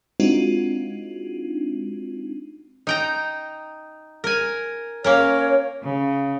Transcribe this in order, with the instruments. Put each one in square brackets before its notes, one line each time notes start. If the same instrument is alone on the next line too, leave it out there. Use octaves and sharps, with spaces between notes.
[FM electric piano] G#3 C4 D4 D#4 F4 F#4
[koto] D#4 G5 A#5
A#4 G#5
[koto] A#3 C#4 A#4 [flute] C#5
[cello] C#3